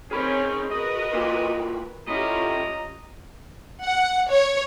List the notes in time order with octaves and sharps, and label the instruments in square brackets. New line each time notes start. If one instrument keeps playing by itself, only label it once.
[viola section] C4 D#4 A#4 [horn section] C#4 [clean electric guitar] G#4 B5
[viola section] F#4 A#4 B4 [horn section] D#5
[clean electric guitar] A2 A#3 F4
[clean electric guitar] A2 E4 [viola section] C#4 F4 G4 [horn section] D#5 A#5
[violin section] F#5
C#5